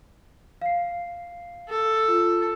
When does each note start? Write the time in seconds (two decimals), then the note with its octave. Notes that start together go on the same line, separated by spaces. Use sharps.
0.62 F5 C7
1.69 A4
2.08 F4